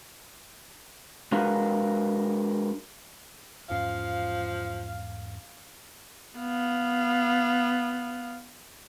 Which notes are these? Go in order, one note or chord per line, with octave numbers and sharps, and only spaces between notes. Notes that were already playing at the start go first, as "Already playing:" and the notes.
G#3 D4 F#4 A#4 B4 F5
E2 G#2 F3 C#4 F5
B3 F5